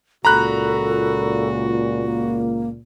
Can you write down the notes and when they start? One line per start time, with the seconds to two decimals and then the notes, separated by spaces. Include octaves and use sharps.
0.25 C#2 A#2 F#4 A4 A#5 B5 F#6
2.02 A#3